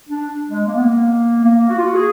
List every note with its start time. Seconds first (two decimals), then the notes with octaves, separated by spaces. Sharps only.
0.10 D4
0.48 G#3
0.67 A#3
0.75 B3
0.82 A#3
1.45 A#3
1.69 F#4
1.77 F4
1.85 F#4
1.95 G#4